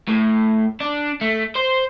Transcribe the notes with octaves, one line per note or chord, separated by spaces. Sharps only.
A2
D4
A3
C5